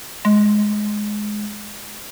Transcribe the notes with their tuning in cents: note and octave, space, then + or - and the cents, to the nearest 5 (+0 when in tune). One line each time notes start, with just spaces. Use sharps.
G#3 +10